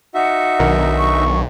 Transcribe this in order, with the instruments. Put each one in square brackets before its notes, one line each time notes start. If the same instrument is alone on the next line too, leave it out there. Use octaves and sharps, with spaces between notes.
[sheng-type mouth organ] D#4 F#4 E5 [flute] F#5
[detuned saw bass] B1 [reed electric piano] D#3 D4 A#4
[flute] C#6